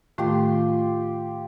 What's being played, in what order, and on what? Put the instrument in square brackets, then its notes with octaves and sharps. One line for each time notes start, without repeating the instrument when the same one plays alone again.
[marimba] A2 D#3 A3 [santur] F4 G4 C6